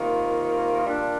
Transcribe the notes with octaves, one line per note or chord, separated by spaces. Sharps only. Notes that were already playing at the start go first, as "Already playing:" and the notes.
Already playing: C3 D#3 A#3 F4
A#2 G3 D4 F4